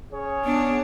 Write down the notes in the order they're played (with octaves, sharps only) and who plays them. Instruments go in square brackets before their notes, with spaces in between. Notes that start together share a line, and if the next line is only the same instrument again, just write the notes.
[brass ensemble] C#4 G#4 C#5
[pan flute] B3 [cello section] D4